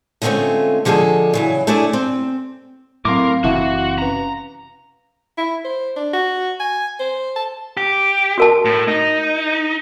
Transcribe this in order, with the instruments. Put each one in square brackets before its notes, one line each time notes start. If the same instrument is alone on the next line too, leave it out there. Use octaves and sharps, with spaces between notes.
[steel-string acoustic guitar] D3 G#3 A3 C4 C#4 F4
D3 F3 G#3 G#4 A4
C#3 E3 F#3
A3 D4 E4 G#4 D5
C4
[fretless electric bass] A2 [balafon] F#3 C4 [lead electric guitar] A#4 [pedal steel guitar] F5 C6 D6
[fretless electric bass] F#1 C3 E3 [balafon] E4 E5 A5 [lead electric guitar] F#4
[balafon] C#4 B4 [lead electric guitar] A#5
[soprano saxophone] E4
C5
D4
F#4
G#5
C5
A5
[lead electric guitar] G4
[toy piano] F#4 A#4 A5
[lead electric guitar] A2
D#4